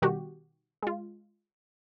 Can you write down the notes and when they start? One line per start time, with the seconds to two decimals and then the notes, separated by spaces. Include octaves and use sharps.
0.02 B2 D#3 G3 F#4 G4
0.82 G#3 F4